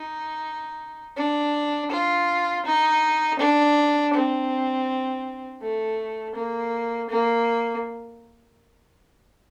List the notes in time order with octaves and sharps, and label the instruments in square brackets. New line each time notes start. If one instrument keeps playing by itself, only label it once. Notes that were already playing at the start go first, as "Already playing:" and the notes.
Already playing: [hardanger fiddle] D#4
D4
F4
D#4
D4
C4
A3
A#3
A#3